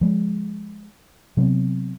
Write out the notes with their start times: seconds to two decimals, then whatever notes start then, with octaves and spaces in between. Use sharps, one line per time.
0.01 F3 G#3
1.37 C3 F#3 B3 C4